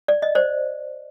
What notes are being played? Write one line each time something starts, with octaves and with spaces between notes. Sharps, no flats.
D5
D#5
C5 D5